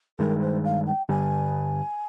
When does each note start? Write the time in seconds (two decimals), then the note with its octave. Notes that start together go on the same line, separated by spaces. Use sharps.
0.19 G2 D#3 G#3 A#4
0.42 C5
0.64 F5
0.86 G5
1.09 G2 D3 G3 G#5